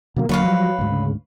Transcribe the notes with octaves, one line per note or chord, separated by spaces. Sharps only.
B2 D3 F#3 A#3
E1 D3 F#3 A#3 B4 C#5 F5
F3 G3
D2 G#2
C#3